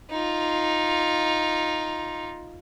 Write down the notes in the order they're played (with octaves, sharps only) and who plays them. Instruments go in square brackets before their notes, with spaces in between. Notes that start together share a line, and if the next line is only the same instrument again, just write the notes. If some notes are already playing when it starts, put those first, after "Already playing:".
[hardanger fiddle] D#4 F4